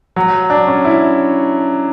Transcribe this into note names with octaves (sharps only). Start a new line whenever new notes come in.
F#3
D4
C#4
E4